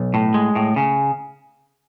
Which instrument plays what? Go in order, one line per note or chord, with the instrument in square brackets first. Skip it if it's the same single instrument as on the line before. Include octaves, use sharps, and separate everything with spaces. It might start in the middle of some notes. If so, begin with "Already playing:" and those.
Already playing: [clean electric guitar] B1
A2
G#3
A2
C#3